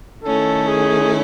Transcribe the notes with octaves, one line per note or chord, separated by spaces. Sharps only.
D#3 A3 C#4 E4 A4
G#4